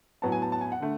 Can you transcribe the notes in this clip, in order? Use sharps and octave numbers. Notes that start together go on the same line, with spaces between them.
A2 F#3 B3 A5
G#5
A5
A5
G#5
F#5
D3 A3